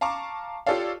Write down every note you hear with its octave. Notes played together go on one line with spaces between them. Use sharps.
F5 A5 A#5 C#6 D6
F4 G4 A4 C#5 D5 F5